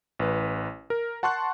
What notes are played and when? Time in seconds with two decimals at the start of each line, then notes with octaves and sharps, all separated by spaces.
0.19 A1 B4
0.90 A#4
1.23 F#5 A5 C6 C#6 F#6